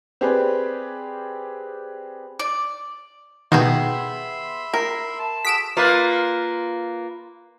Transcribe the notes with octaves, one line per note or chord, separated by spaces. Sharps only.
C4 G4 G#4 B4 D5
D5
B2 D#3 B3 G4 G#4 E5 B5 C6
A#4
A5
F#4 G#4 A4 B6 D7 E7
A#3 F4 B4